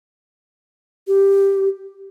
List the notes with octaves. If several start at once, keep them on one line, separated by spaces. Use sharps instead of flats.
G4